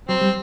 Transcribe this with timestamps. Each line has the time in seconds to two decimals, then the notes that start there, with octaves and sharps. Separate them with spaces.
0.09 F#3 C4
0.21 G3